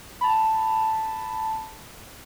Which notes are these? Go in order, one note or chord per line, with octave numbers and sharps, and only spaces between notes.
A5 B5